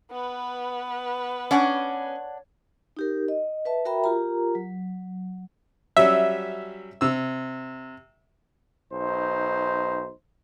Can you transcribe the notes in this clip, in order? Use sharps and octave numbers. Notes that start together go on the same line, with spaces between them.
B3 B4
C#4 D4 F#5 D6
D#4 G4 A#4
D#5
B4 E5 A5
F#4 A#4 E5 G5 A#5 B5
F4 G4 A#4 A#5
F#3
F#3 G3 C#4 E5
C3 E6
B1 D#4 C5